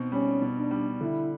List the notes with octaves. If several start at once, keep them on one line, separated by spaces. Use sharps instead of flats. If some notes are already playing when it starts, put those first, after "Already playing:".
Already playing: B2 C4 D#4
G3 C#4
B2
D4
G3
D3 E4